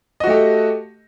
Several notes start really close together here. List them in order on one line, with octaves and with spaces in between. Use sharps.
D#5 F#4 A3 G4